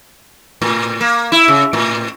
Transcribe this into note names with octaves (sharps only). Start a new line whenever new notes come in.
A2
A#3
E4
C#3
A2